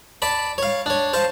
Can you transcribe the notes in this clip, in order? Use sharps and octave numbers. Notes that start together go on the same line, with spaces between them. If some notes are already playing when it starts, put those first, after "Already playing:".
D5 A5 B5
C#5 F5
D4 C#5
C5 F5 A5